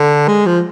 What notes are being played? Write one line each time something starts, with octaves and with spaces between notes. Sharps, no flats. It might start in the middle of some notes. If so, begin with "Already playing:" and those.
Already playing: D3
G#3
F3